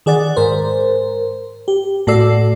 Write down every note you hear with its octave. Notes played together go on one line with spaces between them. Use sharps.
D#3 G#4 D5 F#5 A6
G#2 A#4 C5
G4
A2 F#4 A4 D5 E6 C7